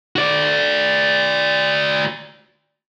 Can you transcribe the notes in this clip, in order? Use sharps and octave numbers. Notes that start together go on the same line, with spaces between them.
F#4 D5